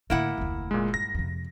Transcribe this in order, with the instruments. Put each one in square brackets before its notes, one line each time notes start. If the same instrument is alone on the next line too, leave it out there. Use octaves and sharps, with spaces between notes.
[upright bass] A2 D3 [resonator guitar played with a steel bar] A#3 E4 F#5
[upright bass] F1 D2
[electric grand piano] A#2 G#3
[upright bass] G2 [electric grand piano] A#6
[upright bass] F2 C3